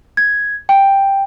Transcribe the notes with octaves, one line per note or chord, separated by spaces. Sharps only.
G#6
G5